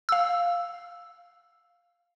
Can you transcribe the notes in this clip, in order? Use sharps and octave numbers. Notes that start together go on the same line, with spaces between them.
F5 E6